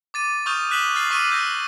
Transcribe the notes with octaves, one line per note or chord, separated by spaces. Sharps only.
D6 A6 D#7
C#6 D#6 F6 G6 F7
D#6 F#6 B6 E7 F#7 G7
F6 A6 C7 G7
C#6 D6 E6 F6 C7 D#7
E6 G6 A#6